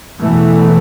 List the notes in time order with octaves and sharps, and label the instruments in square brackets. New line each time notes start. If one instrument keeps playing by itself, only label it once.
[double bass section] E2 B2 E3 A3